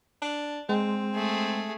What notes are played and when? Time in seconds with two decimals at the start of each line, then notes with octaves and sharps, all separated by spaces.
0.22 D4
0.69 G#3 C4
1.14 A3 G#4